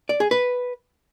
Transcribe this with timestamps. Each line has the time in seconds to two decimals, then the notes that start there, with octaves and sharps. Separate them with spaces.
0.09 D5
0.20 G#4
0.31 B4